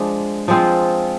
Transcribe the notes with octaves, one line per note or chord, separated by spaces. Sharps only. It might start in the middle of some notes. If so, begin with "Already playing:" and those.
Already playing: F3 G#3 D4
F3 G#3 C4 F4